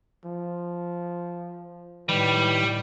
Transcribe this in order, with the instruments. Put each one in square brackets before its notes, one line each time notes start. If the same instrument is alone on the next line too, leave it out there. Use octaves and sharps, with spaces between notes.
[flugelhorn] F3
[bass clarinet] A2 [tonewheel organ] D#3 [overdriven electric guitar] G3 [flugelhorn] B4